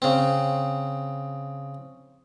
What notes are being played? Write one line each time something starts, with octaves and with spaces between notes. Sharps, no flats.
C#3 C4